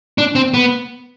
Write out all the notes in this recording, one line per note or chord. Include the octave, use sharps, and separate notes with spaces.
D4
C4
B3